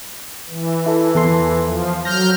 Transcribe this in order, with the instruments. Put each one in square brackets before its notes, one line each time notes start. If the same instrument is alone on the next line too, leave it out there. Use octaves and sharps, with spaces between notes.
[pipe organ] E3
[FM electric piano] E4 A4
E2 A4 C6
[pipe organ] F3
[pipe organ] F#3 F6 G6 [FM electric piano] A#6